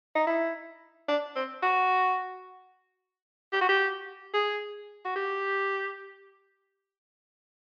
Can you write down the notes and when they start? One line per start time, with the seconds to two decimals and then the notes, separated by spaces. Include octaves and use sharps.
0.16 D#4
0.27 E4
1.08 D4
1.36 C4
1.63 F#4
3.53 G4
3.61 F#4
3.69 G4
4.34 G#4
5.05 F#4
5.16 G4